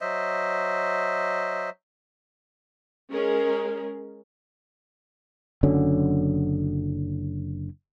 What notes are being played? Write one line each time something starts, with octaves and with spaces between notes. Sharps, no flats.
F#3 C5 D#5 E5
G#3 C#4 G#4 A#4
F#1 D3 F#3 C#4